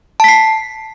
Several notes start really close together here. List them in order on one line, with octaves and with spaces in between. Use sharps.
A5 B6 C7